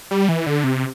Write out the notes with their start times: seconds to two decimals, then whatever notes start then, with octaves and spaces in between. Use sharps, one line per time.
0.11 G3
0.29 E3
0.46 D3
0.64 C3